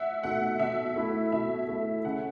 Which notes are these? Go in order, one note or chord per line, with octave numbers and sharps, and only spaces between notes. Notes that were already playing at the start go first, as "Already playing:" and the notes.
Already playing: E5 F#5
B2 A3 D#4 F#5
B2 E5
A3 E4
B2 E5
A3 E4
C#3 F#5